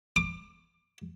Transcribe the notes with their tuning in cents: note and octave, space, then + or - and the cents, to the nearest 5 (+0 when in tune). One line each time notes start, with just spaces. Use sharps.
D6 +25